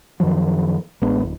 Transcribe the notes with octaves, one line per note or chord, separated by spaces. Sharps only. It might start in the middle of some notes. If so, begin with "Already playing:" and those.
F#2 D#3 F3 F#3
A1 G#3 B3 D4
D1